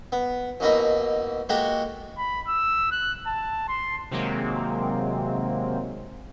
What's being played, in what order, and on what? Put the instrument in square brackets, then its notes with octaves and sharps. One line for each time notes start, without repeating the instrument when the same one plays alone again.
[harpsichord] B3
A1 B2 A#3 D#4 E4
G#3 A#3 F#4 G4 A4
[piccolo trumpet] B5
E6
F#6
A5
C6
[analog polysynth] C3 D#3 F#3 G#3 A#3 C4